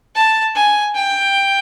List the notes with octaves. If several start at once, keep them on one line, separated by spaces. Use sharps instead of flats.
A5
G#5
G5